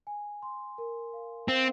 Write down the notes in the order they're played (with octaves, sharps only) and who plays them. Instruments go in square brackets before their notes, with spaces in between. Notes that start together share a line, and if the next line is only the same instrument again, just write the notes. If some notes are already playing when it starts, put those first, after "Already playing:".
[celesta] G#5
C6
A#4
F5
[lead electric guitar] C4 [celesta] F5